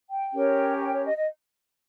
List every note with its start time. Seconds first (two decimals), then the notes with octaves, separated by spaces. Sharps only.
0.09 G5
0.33 C#4 G4 A#4 C#5
0.80 G5
0.93 C#5
1.05 D#5
1.16 D#5